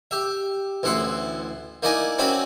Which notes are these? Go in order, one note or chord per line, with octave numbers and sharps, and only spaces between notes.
G4 E5
A1 D2 E4 F#5 C6
A#3 D#4 E4 D5 D#5 G#5
C4 C#4 E4 F#4 D5 B5